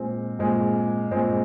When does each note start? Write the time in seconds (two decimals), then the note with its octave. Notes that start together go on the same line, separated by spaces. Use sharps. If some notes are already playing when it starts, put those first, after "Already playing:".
Already playing: A#2 G#3 C4
0.39 A#2 G#3 C4
1.11 A#2 G#3 C4